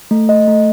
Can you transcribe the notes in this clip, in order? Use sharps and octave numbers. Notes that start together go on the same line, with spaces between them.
A3
D#5
A3